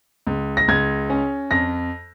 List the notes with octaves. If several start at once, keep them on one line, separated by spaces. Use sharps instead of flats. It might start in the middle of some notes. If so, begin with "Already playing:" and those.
C#2
A#6
C#2 G#6
C#4
F2 A#6